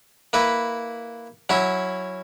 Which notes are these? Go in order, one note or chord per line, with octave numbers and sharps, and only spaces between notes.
A#3 E4 B4
F#3 C#4 E4